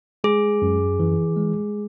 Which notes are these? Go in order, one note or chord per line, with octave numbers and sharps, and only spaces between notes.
G#3 G#4
F#2
E3
G#3